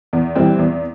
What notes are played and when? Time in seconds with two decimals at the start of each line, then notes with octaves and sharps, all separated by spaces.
0.13 E2
0.35 E3 G3 C4
0.59 E2